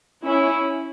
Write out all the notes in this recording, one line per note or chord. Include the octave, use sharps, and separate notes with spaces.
C#4 E4